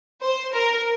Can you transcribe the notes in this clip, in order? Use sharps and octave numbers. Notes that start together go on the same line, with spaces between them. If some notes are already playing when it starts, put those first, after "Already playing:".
C5
A#4